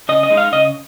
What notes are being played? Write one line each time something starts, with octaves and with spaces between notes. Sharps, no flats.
C#3 D#5
D#5
G#3 D#4
F5
C#3 D#5